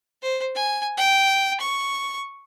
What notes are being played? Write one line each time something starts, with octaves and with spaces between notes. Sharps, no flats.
C5
G#5
G5
C#6